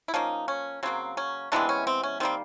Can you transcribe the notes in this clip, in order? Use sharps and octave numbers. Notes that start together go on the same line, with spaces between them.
E4
F3 A#3 C#4 D#4
C#4
C#3 F#3 A#3 C4
C#4
C3 E3 G#3 B3 C4 D4
C#4
C4
C#4
D#3 G3 A#3 C4